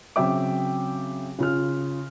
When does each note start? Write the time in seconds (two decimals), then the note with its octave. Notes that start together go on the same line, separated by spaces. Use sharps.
0.16 C#3 F#3 C4 E5 G5 D6
1.39 C#3 F4 F6